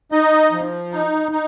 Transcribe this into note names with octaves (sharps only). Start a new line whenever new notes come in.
D#4 D#5
F3
D#4
D#4